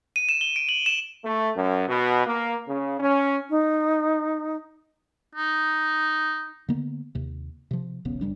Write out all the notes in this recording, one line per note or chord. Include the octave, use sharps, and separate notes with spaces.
D#7
E7
G7
D7
F#7
E7
A3
F#2
B2
A#3
C#3
C#4
D#4
D#4
D3 A#3 B3
D#2 C3
C3 F3
D#1 A#1 C#3 B3
G1 G#2 G3 D4